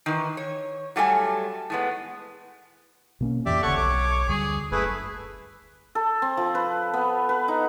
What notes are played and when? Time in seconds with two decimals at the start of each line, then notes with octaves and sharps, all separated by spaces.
0.06 D#3 E3
0.37 C#5
0.96 F#3 G3 A3 E5 G#5
1.70 A2 G#3 B3
3.21 B2 A#3 C#4
3.46 F2 A2 E3 G4 D5 E5
3.63 D#1 D2 C#3 A4 C#5 F#5 C#6
3.78 B1 D6
4.28 D2 D3 G3 G#4
4.72 F#1 A3 E4 G#4 B4
5.95 A4
6.22 C4
6.37 F3
6.55 B4
6.94 B3
7.29 B4
7.48 D#4